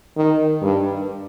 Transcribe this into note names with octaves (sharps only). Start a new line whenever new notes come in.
D#3
G2